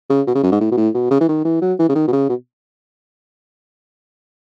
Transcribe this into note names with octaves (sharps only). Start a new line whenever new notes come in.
C#3
B2
C#3
F#2
G#2
A2
B2
A2
B2
C#3
E3
D#3
E3
F#3
E3
C#3
D#3
B2
C#3
B2